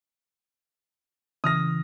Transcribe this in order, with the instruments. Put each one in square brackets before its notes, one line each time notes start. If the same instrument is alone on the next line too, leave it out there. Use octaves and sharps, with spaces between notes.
[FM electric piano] C#3 E3 [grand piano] D#6 F6 A#6